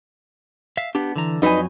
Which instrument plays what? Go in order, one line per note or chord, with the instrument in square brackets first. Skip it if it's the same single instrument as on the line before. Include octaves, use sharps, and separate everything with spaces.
[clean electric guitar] E5 F5
B3 D4 G4
D3 E3 A#5
[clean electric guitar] F2 F#3 G#5 [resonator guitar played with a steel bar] D#4 B4 D#5